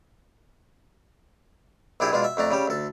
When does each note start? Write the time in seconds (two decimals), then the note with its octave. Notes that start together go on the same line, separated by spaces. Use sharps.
2.00 A#1 D4 E4 G4 G#4
2.12 B2 G#3 D4 F4
2.24 E5
2.37 F2 A3 D4 A#5
2.51 C#3 G3 G4
2.68 D2 A4